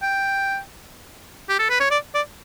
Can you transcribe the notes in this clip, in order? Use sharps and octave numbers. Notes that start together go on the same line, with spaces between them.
G5
G4
A4
B4
C#5
D5
D5